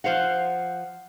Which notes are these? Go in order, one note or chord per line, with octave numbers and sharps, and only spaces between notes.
F3 C5 F5 F#5